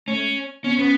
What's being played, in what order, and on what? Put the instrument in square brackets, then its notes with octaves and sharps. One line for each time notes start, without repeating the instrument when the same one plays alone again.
[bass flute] A3 [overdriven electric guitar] C#4
[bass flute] B3 [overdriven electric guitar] C#4
[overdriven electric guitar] B3 [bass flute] C#4